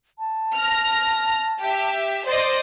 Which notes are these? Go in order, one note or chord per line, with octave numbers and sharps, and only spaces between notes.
A5
F6 A#6
G4 E5
C5 D5 D#5